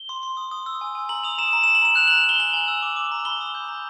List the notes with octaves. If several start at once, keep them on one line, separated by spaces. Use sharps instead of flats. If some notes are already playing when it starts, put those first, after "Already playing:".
Already playing: G7
C6
C6
D#6
D#6
E6
G#5
G#5
A#5 F#7
D#6 F7
A#5 E7
A#5
A#5 E7
F#7
A#5 E7
F#6 F7
A#5 F#7
F7
A#5 G7
G#5 F#7
G#5
E6
D6
D6
A#5
B5 G7
D#6
G6
A#5